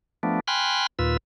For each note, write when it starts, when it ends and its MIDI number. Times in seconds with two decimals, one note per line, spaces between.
0.23 0.40 53
0.23 0.40 57
0.23 0.40 59
0.23 0.40 62
0.48 0.87 79
0.48 0.87 80
0.48 0.87 83
0.48 0.87 84
0.48 0.87 89
0.48 0.87 90
0.99 1.17 39
0.99 1.17 46
0.99 1.17 65
0.99 1.17 71
0.99 1.17 88